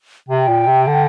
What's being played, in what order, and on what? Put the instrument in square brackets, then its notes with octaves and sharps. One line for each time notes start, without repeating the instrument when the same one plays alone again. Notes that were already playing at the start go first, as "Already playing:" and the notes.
[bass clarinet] C3 [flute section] G5
[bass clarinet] A#2
C3
D3